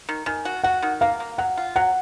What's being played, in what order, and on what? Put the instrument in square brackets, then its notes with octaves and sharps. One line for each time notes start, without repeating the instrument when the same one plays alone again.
[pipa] D#3
[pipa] D#3 [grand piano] G#5
[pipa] F#4
[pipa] F#4 [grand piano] F#5
[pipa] D#3
[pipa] A#3 [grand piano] F5
[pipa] A#3
[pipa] F#3 [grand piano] F#5
[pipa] F4
[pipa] F#3 [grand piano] F#5